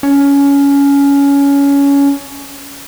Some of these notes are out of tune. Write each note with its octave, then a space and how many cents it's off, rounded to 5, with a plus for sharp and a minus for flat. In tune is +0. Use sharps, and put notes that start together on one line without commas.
C#4 +20